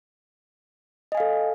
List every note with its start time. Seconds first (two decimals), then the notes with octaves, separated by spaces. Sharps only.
1.12 D#5
1.15 G#5
1.17 F5
1.20 A4